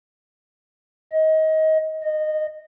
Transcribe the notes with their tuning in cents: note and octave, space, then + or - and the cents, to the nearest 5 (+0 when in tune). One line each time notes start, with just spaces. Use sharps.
D#5 +25
D#5 -15